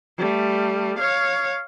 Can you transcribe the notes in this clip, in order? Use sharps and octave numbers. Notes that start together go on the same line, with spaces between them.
G3 A3
C#5 F5